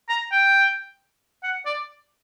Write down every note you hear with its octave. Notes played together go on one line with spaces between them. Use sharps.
A#5
G5
F#5
D5